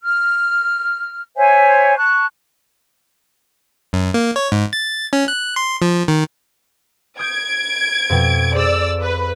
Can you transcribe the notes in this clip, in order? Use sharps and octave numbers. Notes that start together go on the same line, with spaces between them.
F6
C5 C#5 E5 G#5
A5 C#6 F#6
F#2
A#3
C#5
G#2
A6
C#4
F#6
C6
F3
D#3
D#6 G6 G#6 C#7 D7
F2 B2 G5
G#4 C5 D5 E6
B4